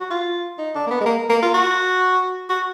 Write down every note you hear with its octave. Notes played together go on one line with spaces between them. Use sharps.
F#4
F4
D#4
D4
A#3
B3
G#3
A#3
A#3
F4
F#4
F#4